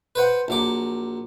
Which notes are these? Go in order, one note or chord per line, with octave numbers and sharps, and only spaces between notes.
B4 C5 F#5
A#1 F#3 D6